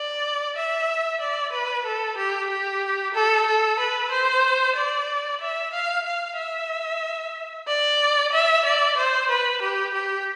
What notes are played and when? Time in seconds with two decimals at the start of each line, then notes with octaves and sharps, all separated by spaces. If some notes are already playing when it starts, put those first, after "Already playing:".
Already playing: D5
0.56 E5
1.20 D5
1.52 B4
1.85 A4
2.18 G4
2.50 G4
3.14 A4
3.46 A4
3.79 B4
4.12 C5
4.76 D5
5.41 E5
5.73 F5
6.06 F5
6.38 E5
7.68 D5
8.32 E5
8.65 D5
8.97 C5
9.30 B4
9.62 G4
9.94 G4